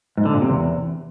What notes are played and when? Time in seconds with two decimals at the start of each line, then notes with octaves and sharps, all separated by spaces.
0.17 G#2
0.26 D3
0.34 A#2
0.42 C3
0.50 E2